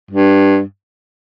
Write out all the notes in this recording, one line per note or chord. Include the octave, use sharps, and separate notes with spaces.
G2